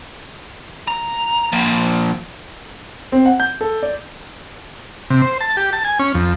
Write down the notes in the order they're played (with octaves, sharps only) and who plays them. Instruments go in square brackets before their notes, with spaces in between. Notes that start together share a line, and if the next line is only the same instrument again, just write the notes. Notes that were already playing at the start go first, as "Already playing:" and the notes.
[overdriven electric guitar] A#5
F3 A#3
[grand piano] C4
F#5
G6
A4
D5
[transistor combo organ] C3
C5
A5
G4
A5
G#5
C#4
F2